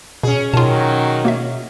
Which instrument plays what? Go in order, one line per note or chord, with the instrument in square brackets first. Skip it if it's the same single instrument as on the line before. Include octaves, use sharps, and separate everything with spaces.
[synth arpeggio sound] B2 [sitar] C#4 G#4
[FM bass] B2 [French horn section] D#3 F#3 [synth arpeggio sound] F4 A5
[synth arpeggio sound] A#3 F#4 E5